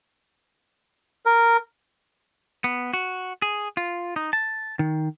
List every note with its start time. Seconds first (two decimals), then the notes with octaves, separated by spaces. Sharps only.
1.26 A#4
2.64 B3
2.93 F#4
3.42 G#4
3.77 F4
4.16 D#4
4.33 A5
4.79 D#3